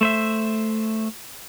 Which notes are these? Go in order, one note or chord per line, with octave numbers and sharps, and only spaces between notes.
A3 C5 E5